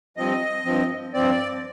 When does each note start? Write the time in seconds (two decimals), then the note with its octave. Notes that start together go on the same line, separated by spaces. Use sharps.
0.17 G2 F3 C4 D#5
0.65 G2 F3 C4
1.14 G2 F3 C4 D5